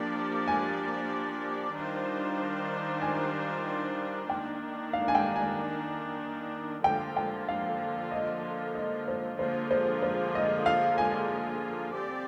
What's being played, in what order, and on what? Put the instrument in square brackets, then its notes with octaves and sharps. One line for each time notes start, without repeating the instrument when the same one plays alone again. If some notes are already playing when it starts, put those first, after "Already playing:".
Already playing: [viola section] F3 A#3 D4 G4 D5
[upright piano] G#5
[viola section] D#3 G3 D4 F4 C5
[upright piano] G#5
[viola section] D#3 A#3 D4 [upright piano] G5
[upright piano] F5
G#5
G5
G#5
[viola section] D3 F3 A#3 F4 [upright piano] G5
[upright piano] G5
F5
D#5
D#5
C5
[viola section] D3 F3 A#3 F4 G#4 [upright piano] C5
[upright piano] C5
C5
D#5
F5
G#5
[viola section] C4 G4 D5